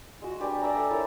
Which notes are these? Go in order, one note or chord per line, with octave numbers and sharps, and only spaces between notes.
G#3 F#4
D4 G4 B4 G#5
D5 E5 A#5
A4
E4 A#4 C#5 D#5